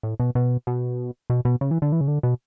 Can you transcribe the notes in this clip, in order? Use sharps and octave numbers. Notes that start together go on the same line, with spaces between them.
A2
B2
B2
B2
B2
B2
C#3
E3
D3
E3
C#3
D3
B2